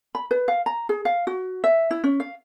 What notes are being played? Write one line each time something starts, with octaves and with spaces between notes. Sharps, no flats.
B5
B4
F5
A#5
G#4
F5
F#4
E5
E4
C#4
F5